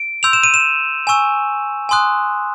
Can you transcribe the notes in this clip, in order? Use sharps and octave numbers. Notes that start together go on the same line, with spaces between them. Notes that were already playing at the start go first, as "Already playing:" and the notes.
Already playing: D7
C6 E6 G6 F7
E7
D#7
E7
G#5 C#6 E6
G#5 C6 D#6 F#6